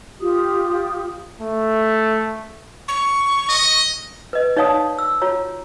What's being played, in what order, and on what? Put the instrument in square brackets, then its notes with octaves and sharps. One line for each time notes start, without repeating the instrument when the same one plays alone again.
[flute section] F4 G4 D#6
[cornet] A3
[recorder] C#6
[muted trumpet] D#5
[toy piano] B4 D#5
D#4 C#5 D5 F5 A5 D#6
E6
F4 F#4 C#5 A#5